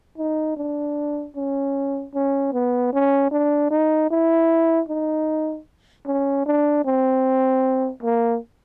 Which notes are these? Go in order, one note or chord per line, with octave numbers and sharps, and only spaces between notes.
D#4
D4
C#4
C#4
B3
C#4
D4
D#4
E4
D#4
C#4
D4
C4
A#3